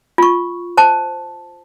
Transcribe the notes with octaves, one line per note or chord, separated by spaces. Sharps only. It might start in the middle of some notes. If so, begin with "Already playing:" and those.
F4 C#6
C5 A5